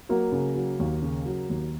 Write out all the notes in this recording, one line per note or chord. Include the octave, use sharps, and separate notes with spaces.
F#3 A#3
C#3
F#3
D#2
C#3
F#3
D#2